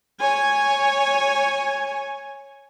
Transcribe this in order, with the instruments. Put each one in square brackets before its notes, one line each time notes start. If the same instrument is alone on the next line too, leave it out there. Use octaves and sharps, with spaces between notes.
[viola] C#5 G#5